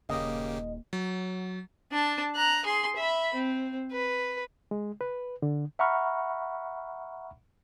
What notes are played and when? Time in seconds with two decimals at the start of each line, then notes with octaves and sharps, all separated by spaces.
0.09 D#1 C#3 A#3 G4 D#5
0.93 F#3
1.92 D4 A5
2.36 A#5 F#6
2.65 G#4 C6
2.96 E5 B5
3.34 C4
3.92 B4
4.71 G#3
5.01 B4
5.42 D3
5.79 E5 F#5 A#5 B5 C#6 F6